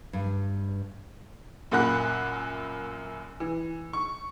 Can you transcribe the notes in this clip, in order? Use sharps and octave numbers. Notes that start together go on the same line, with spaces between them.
G2
F#2 A#2 A#3 F#5 B5 F#6
E3
C#6